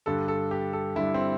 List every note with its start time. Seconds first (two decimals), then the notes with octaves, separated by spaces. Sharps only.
0.06 G2 D3 G3 A4
0.28 A4
0.51 G4
0.73 A4
0.96 G2 D3 G3 E4
1.14 C4